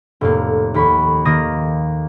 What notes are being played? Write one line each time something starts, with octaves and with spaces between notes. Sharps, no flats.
F1 A2 A#3
D#2 B5 C#6
D#3 A#3 D#6 A#6